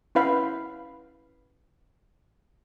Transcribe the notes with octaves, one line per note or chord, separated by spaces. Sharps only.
C#4 E4 B4 F5 F#5 B5